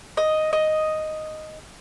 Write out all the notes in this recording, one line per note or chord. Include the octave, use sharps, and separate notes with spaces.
D#5
D#5